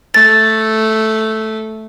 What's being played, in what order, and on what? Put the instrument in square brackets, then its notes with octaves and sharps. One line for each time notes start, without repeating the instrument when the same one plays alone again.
[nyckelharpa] A3 [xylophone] A6